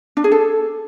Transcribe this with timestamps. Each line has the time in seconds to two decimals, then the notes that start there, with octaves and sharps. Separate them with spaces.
0.17 D4
0.24 G#4
0.32 A4